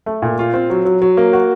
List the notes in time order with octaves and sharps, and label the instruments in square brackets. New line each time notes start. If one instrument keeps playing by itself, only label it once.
[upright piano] A3
A#2
F4
C4
F#3
F#3
F#3
A#3
F#4